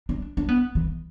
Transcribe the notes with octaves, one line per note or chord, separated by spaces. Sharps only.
D4
D4
B3
E3